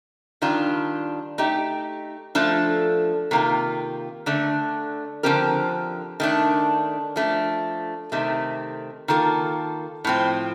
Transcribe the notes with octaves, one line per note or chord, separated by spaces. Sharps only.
D#3 G3 D4 F4
A3 D#4 G4
F3 A3 D4 A4
C3 D#3 A#3 F4
D3 A3 D4
D3 F3 C4 G4 A#4
D#3 A3 D4
F3 A3 D4
C3 D#3 A3
D#3 A#3 F4 A4
A2 F3 C4